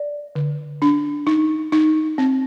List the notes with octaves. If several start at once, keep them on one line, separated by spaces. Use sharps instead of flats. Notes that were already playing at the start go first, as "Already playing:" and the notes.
Already playing: D5
D3
D4
D#4
D#4
C4